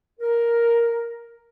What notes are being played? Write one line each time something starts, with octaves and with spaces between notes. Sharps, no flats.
A#4